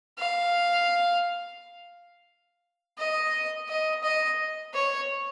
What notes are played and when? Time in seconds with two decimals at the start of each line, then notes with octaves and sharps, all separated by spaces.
0.18 F5
2.98 D#5
3.69 D#5
4.03 D#5
4.74 C#5